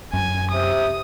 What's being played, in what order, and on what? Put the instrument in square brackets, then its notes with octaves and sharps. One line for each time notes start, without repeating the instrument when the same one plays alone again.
[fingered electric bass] F#2 [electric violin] G#5
[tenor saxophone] C3 [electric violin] D#6